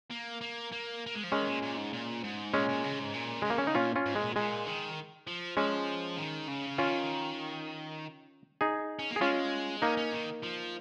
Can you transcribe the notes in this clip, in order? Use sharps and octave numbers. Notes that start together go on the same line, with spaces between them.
A#3
A#3
A#3
A#3
G#3
F3
D#3 G#3 C#4
A#2
A#2
G#2
A#2
G#2
A#2 G#3 C#4
A#2
C#3
G#2
A#2
C#3 G#3
A#3
C#4
D#4
A#2 C#4 F4
C#4 F4
G#2
G#3
A#2
A#2 G#3
D#3
F3
F3 G#3 C#4
D#3
C#3
D#3 C#4 F4
D#4 G#4
C#4
A#3
G#4
G#3 C#4 F4
A#3 C#4 D#4
C#4
D#3
F3